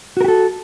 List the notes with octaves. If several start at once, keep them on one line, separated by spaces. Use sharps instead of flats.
F#4 G4 A4 A#4